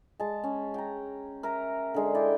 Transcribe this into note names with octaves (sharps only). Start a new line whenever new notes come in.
G#3 A5
C#4
G5 A#5
A#4 E5 A#5
D3 G#3
E4 D5 G5